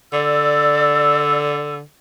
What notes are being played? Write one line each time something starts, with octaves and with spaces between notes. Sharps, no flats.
D3 D5 E6